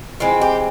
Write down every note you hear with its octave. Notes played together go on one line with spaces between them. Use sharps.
E3 G#3 C4 F4
G4